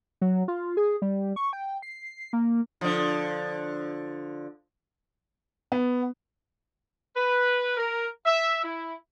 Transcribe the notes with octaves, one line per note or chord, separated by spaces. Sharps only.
F#3
F4
G#4
G3
C#6
G5
C7
A#3
D3 F3
B3
B4
A#4
E5
E4